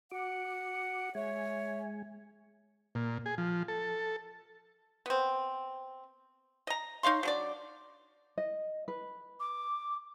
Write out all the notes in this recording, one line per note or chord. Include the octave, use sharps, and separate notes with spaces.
F#4 F#5 D6
G#3 C#5 E5 G#5
A#2
G#4
F3
A4
B3 C4
D#5 A#5
D#4 C#5 F5 C6
F#3 D4 D5
D#5
B4
D6